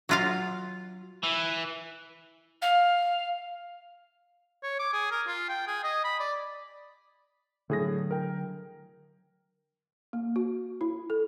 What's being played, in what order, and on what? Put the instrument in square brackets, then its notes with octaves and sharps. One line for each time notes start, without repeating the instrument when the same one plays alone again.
[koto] F#3 F4 F5
[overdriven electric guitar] E3
[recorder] F5
[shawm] C#5
D6
G#4
A#4
F4
G5
G#4
D#5
B5
D5
[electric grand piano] A2 G#4 A#6 [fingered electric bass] D3 F#3
[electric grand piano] A#4 G5
[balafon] A#3
F#4
E4
A4